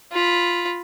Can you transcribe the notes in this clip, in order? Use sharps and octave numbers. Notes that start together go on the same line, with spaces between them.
F4 B5